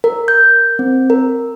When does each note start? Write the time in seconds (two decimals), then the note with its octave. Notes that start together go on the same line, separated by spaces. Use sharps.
0.04 A#4
0.28 G6
0.79 C4
1.10 A#4